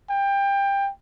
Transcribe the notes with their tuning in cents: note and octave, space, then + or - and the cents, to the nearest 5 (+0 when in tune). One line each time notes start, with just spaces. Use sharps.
G5 +20